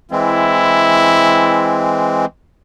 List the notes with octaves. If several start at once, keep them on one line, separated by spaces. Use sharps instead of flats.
E3 G#3 C4 E4